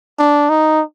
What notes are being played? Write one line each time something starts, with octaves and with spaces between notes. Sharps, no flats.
D4
D#4